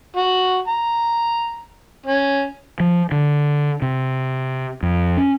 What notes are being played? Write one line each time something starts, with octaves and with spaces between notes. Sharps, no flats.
F#4
A#5
C#4
F3
D3
C3
F2
C#4